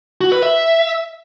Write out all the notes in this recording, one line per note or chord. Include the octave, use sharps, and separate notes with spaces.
F#4
B4
E5